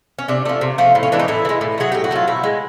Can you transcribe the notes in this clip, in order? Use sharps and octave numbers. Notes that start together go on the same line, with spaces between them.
C#4
C3 D4
F3 A3
C3
F3 A3
A2
C#4
E3 G#3 D4
D#4
A2 E4
E3
G#3
A2
F#3 A3 G#4
A2 G4
F#4
F#3 A3 F4
B2 E4
G#3